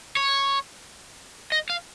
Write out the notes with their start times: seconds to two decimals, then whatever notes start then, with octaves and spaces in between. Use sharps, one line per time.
0.17 C#5
1.52 D#5
1.70 F5